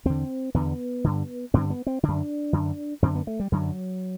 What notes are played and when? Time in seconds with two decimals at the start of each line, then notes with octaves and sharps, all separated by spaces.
0.05 E2 D3 C4
0.54 E2 D3 B3
1.04 G2 D3
1.54 G2 D3 C4
1.70 B3
1.87 C4
2.03 F#2 D3 D4
2.53 F#2 D3
3.02 F#2 D3 C4
3.15 B3
3.27 A3
3.40 G3
3.52 F#2 D3 F#3